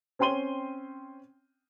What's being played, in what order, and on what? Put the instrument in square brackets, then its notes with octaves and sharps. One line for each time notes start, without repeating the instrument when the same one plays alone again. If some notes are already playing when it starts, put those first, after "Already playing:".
[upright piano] C4 C#4 G5 C6 D#7 G7